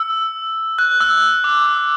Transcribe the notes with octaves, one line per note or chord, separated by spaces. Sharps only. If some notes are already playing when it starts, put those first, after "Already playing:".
Already playing: E6
F#6
E6
D6
E6